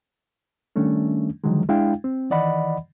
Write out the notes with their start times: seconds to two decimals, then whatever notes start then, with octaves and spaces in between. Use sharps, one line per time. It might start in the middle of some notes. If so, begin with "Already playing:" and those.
0.76 D#3 G3 A3 C#4 D4
1.44 D3 D#3 F3 F#3 G#3
1.69 G#3 D4 E4 F5 G5
2.04 C4
2.30 D#3 E3 D5 D#5 F#5 B5